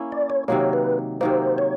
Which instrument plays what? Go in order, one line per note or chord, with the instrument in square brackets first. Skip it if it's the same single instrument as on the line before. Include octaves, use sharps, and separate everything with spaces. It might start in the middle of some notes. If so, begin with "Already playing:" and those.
Already playing: [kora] A#3 C#4 E4
[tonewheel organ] D5
C#5
[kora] C3 D#3 F#3 A#3 [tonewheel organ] C#5
[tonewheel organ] B4
[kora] C3 D#3 F#3 A#3 [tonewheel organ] C5
[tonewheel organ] C#5